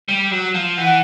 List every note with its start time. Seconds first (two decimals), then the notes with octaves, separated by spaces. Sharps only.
0.08 G3
0.31 F#3
0.54 F3
0.78 E3 F#5